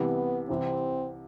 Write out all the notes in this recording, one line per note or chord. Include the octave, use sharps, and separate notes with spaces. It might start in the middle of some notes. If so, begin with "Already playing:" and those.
Already playing: C2 C3 E3 G3 B3
C2 C3 E3 C4